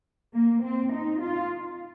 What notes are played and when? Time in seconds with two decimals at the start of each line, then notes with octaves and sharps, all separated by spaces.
0.34 A#3
0.63 C4
0.92 D#4
1.21 F4